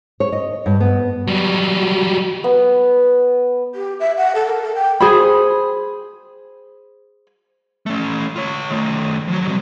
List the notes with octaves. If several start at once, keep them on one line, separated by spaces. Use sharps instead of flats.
C#5
D#5
G2
B3
F#3 G3
B3
G4
E5
F#5
A4
A#4
A4
G5
G#4 C5 B5
A3 C#4
F4 C#5
D#3 A3
F3 F#3
G3 C4